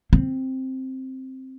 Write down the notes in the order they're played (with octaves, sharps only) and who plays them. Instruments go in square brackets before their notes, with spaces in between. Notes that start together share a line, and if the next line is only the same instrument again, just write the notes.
[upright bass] C4